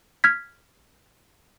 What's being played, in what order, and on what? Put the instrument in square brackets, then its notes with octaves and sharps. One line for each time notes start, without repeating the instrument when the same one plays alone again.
[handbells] F6 G#6 B6